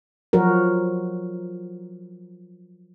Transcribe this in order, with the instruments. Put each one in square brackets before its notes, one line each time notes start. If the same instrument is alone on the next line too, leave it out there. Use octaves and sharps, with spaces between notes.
[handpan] F3 F#3 F#4 A#4